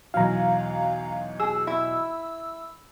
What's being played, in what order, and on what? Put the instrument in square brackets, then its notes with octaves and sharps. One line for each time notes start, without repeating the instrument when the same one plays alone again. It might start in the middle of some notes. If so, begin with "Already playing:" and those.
[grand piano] B1 E2 F#3 [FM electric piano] F5 A#5
[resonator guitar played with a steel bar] G#4 [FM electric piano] E6
[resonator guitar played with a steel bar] E4